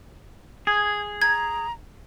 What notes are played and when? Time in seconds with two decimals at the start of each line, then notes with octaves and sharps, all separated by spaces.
0.67 G#4 G#6
1.22 A#5 G#6